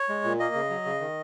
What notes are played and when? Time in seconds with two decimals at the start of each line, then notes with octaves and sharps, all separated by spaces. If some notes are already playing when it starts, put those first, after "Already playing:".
Already playing: C#5
0.09 G#3
0.24 A#2
0.39 A#3 D#5
0.55 C#3
0.70 F#3
0.86 C#3
1.00 D#3